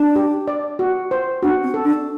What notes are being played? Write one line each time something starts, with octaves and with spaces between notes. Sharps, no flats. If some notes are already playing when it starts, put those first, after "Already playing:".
Already playing: D4 A5
G4
D5
F#4
C5
D4 F#4
C4
A4
D4